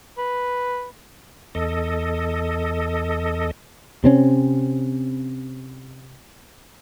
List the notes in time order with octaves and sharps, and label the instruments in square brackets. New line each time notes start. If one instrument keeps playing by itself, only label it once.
[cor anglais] B4
[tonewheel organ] E2 A4 D#5
[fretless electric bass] C3 C4 C#4